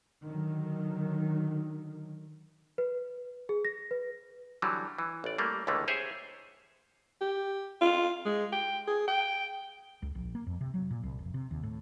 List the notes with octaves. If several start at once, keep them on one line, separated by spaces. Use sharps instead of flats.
D3 D#3 F#3
B4
G#4
A#6
B4
D3 E3 F#3 G3
E3
A1 D5
G3 A3 A#3
C#2 D3 E3 A3 A#3
G4 G#4 C5 C#5 E5
G4
F4
G#3
G5
G#4
G5
C#2
A#1
A#3
F2
C3
F#3
A#2
C2
F1
C3
D#2
A2